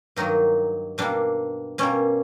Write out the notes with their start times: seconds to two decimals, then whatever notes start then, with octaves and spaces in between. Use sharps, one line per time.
0.16 G2 D#3 F#3 A#3 D#4
0.98 B2 G3 A#3 D4
1.78 B2 G3 A#3 C#4